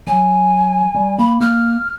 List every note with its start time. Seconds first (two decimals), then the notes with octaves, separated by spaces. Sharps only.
0.07 F#3 G#5
0.95 G3
1.18 A#3 B5
1.41 A#3 F6